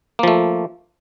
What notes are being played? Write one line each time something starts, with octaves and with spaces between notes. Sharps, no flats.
F3 A3 A#3